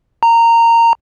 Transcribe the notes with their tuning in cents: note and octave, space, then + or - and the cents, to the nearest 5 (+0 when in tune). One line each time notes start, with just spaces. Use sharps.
A#5 -15